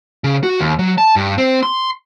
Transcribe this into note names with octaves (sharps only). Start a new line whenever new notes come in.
C#3
F#4
D#2
F#3
A5
G2
C4
C6